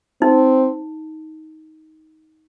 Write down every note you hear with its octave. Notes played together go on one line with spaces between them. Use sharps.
C4 D#4